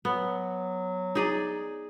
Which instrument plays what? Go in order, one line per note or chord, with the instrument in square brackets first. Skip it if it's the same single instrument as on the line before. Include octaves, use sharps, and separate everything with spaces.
[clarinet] F#3 [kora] B3
[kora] D#4 G#4 D5